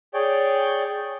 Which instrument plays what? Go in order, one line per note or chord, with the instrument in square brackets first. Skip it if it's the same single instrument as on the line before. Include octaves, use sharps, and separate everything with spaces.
[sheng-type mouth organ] G#4 C#5 D5 G5